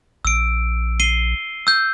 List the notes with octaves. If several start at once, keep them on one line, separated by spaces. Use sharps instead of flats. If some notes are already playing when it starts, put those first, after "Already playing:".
A#1 E6 D7
C7 D#7 G7
E6 G6